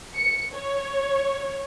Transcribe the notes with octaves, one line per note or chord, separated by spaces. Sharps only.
C#7
C#5